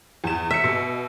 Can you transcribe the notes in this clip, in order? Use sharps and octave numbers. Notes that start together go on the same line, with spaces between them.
E2 E7
E5 E6 C#7
B2